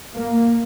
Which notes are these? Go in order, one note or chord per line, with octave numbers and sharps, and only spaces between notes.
A#3